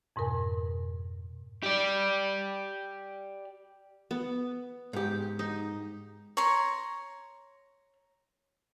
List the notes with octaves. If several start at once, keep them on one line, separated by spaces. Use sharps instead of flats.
F2 G#2 B2 A#4 G#5
G4 D5
B3
G#2 G4
D#4
C#5 A#5 C6